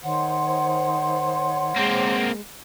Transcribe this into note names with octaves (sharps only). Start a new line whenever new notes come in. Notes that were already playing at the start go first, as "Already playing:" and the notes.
D#3 C5 C#5 F#5 C6
G#3 A#3 C4